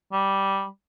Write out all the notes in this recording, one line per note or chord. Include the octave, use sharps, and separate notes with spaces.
G3